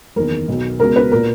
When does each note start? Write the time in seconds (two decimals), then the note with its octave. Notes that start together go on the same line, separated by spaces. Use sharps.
0.16 F#1 E2 D#3 A#4
0.48 B1 B2
0.80 C#2 B2 A#4
0.96 B4
1.12 A#2 A#4